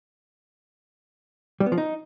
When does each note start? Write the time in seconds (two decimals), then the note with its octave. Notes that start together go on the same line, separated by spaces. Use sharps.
1.60 G3
1.66 B3
1.72 F3
1.78 D#4